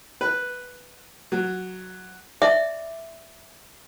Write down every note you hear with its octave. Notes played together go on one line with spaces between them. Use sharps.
B4
F#3
D5 E5